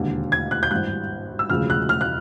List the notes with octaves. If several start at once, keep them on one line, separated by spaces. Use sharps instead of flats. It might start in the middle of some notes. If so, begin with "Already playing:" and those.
Already playing: E1 D#2 D3
G#6
F#6
G6
G#1 G2 E3 G3 F#6
E6
E1 D2 C#3 F3 F6
F#6
F6
F#6